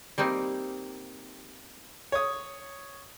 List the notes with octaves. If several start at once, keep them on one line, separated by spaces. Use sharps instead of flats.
G3 A#3 C4 D#4
C#5 D#6